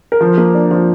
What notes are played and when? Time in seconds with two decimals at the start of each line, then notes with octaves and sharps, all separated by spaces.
0.12 A#4
0.21 F3 C5
0.38 A#3
0.55 D4
0.71 F3